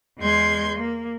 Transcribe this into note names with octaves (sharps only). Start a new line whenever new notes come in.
E2 G#3 C6 G6 G#6
A#3